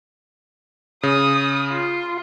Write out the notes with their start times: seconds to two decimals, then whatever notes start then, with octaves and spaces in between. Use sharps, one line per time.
1.03 C#3 D#6
1.71 F4